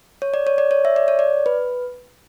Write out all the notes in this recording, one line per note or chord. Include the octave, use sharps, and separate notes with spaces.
C#5
D5
C#5
D5
C#5
E5
D5
C#5
D5
B4